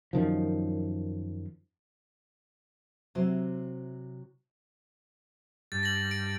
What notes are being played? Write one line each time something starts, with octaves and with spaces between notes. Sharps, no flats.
F#2 D#3 F3
C3 F#3 E4 C5
G2 A6
A#6 F#7
D7